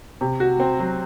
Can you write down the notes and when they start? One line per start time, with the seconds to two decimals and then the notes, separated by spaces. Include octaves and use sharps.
0.21 C3
0.40 F#4
0.60 C4
0.79 F#3